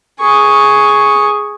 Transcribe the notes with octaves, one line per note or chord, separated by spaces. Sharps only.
G#4 C#6